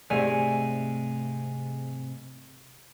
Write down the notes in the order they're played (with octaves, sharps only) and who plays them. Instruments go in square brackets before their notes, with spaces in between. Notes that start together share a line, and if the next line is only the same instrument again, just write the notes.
[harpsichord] G#2 G#5 [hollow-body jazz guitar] C3 A3 D5